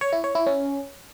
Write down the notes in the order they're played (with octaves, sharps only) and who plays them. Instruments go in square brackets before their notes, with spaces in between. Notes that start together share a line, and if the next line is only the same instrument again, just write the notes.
[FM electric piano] C#5
E4
C#5
E4
C#4